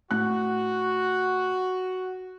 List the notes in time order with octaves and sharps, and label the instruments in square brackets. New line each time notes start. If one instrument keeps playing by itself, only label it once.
[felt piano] A2 F#6 [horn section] F#4